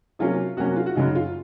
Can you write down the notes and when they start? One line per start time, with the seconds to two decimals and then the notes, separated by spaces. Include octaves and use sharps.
0.19 C3 F#3 A#3 C#4 F4
0.57 C3 F#3 A#3 C#4 F#4
0.76 F4
0.86 F#4
0.95 F#2 C#3 F#3 D#4
1.15 F4